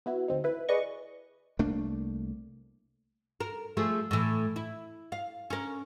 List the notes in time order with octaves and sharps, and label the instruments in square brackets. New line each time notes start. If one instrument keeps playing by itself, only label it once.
[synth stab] B3 E4 F#4
D2 C4 D#4
E4 B4
G#4 B4 D5 D#5 C#6
[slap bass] C2 A3 A#3 D4
[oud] A#4
F3 A3 G#4
A2 E3
E4
F5
C#4 A#4